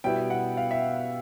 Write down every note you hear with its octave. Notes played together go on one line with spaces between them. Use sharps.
B2 G3 B3 E4 G5
F#5
F5
E5